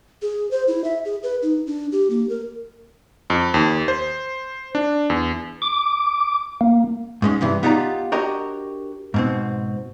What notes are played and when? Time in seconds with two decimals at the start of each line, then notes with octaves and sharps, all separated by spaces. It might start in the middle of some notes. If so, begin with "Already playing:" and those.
0.22 G#4
0.51 C5
0.68 E4
0.84 E5
1.05 G#4
1.23 B4
1.42 D#4
1.67 D4
1.92 G4
2.10 A#3
2.29 A#4
3.30 F2
3.54 D#2
3.88 C5
4.75 D4
5.10 E2
5.62 D6
6.61 A#3
7.22 G#2 G#3 C#4
7.41 G2 C3 E3
7.63 B3 D#4 F4 G4 D5 A#5
8.12 D4 F#4 G4 A#4 C#5 D#5
9.14 G#2 B2 C4